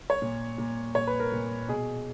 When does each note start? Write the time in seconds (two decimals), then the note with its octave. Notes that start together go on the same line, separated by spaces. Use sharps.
0.10 C#5
0.22 A#2
0.58 A#2
0.95 A#2 C#5
1.07 B4
1.20 A#4
1.32 A#2
1.68 B2 G#4